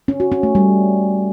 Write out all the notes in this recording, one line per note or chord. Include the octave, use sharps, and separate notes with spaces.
C#4
F#4
C#4
A3
G3